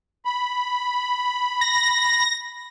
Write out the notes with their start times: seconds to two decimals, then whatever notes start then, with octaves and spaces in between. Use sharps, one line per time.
0.25 B5
1.61 A#6